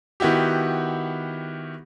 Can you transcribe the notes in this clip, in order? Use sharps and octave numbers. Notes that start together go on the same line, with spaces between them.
D#3 B3 E4 F#4 G4